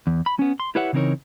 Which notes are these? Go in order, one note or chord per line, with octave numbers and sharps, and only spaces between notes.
E2
B5
B3 C#4
C6
E4 G4 B4 C#5 E5 F#5
C#3 E3 C4 D#4 A#4 C#5